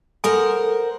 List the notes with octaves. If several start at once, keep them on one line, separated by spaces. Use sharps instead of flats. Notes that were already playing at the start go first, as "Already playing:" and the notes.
A4 A#4 C5 F#5 G#5